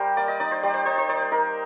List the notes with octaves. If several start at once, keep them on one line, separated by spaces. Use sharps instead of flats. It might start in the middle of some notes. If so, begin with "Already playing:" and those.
Already playing: G3 A#4 C5
A#3 D5
D#5
D#4 D5
C5
G3 D5
C5
D#4 C5
C5
D#4 D5
D#4 A#4